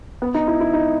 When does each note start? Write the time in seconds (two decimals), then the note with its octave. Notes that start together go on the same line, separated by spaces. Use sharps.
0.22 B3
0.34 D#4
0.47 E4
0.60 E4
0.73 D#4